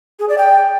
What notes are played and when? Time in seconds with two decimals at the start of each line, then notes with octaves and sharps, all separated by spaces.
0.20 G#4
0.29 D5
0.38 G5